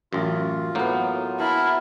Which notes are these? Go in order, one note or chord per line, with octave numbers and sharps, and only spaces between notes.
A1 F#2 F4
A2 F#3 A#3 B3
E4 G#4 A#4 A5